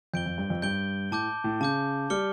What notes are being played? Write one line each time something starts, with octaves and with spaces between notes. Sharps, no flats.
F2 G6 D7 G7
F2
G2
F2
G2 G6 D7 G7
A2 A5 D6 G6
A2
C#3 A5 D6 G6
G3 D6 F6 C#7 G7